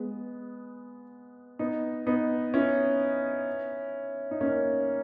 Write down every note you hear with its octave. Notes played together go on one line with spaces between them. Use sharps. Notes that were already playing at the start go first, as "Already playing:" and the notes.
Already playing: G#3 B3
B3 D#4
B3 D#4
C#4 E4
D#4
A#3 C#4